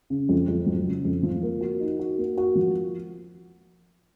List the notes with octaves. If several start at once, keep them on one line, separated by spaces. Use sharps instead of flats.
C#3
F2
F2
F#3
C#3
F2
F3
A#3
F#4
D#4
F#4
A#3
F#4
F3